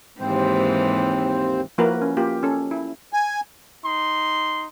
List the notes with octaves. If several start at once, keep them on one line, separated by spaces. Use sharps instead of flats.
D#2 G#2 E3 C4 C5
F3 A#3 E4 F#4 A#4 B4
C#4
A#3 F4 G4
C#4 A4
E4
G#5
D#4 C6